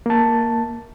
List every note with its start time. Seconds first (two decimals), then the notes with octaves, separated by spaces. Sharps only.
0.06 A#3 A5